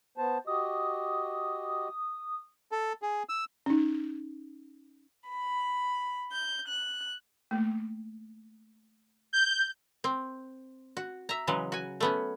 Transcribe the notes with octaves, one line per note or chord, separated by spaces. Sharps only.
B3 C5 A5
F#4 G4 D#5 D#6
A4
G#4
E6
C#4 D#4
B5
G6
F#6
A3 A#3
G6
C4
F#4
E5 A#5
C#3 E3 F#3 G#3
F#4 G#5
A3 B3 C#4